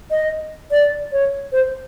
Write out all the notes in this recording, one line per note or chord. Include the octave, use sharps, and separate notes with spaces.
D#5
D5
C#5
C5